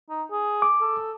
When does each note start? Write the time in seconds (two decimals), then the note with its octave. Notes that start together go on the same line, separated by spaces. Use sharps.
0.10 D#4
0.31 G#4
0.62 D6
0.81 A4